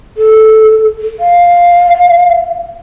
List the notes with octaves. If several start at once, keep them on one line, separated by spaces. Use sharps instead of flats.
A4
F5